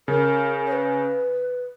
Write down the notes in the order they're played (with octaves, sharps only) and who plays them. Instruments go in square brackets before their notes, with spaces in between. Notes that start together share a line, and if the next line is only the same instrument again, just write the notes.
[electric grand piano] C#3 [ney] A#4
[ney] C#5
B4